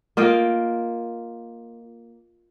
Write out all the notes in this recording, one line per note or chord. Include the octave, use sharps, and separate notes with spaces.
A#3 F4 D#5 G5